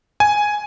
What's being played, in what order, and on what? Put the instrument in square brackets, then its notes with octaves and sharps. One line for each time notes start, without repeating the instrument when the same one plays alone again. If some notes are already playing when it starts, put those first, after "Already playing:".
[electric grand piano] G#5